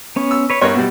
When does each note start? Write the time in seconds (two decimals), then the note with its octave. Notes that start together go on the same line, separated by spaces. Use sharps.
0.16 B3 C#4
0.31 E6
0.50 B4 C#5
0.61 G2 B3 D#4 A#4 C#5 C#6
0.75 B2 G3 E4